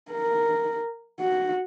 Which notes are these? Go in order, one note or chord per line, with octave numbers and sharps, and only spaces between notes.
A#4
F#4